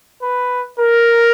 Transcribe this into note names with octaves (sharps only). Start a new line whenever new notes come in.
B4
A#4